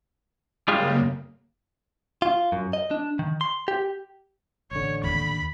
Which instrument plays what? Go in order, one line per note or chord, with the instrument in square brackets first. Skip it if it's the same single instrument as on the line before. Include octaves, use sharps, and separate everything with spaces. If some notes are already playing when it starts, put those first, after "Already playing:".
[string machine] F#2 C#3 A#3 [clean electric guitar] G3 G#3 F4
[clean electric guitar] F4
F#2
D#5
D4
D#3
C6
G4
[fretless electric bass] A1 D3 [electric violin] C#5
[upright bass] D#2 [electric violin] B5